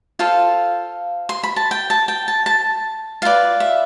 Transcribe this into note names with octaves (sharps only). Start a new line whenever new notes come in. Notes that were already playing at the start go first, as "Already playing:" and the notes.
F4 A4 C5 F5
C6
B5
A5
G5
A5
G5
A5
A5
F4 B4 D5 F5
E5